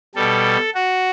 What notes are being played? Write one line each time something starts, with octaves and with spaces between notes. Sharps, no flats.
B2 G3 A4
F#4